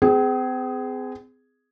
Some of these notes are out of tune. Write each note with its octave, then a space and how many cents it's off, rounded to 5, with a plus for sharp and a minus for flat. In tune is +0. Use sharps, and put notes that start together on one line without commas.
C4 -40 G#4 +0